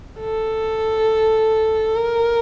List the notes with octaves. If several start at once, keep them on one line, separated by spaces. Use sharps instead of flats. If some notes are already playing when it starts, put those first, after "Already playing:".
A4
A#4